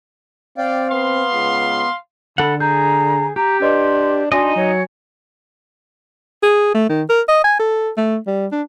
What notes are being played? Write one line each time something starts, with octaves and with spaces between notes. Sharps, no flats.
C4 D5 F5 G5
B3 F5 C6
C#2
D3 A4 F#5 B5
G#4 A#5 G6
G4 A#5
D4 B4 D#5 C6
D4 D#4 F#4 D#5 G#5 C6 A#6
F#3 C#5
G#4
A3
D#3
A#4
D#5
G#5
A4
A3
G3
D4